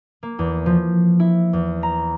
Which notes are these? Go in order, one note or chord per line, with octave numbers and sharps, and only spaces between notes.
A#3
E2
F3
E4
E2
A#5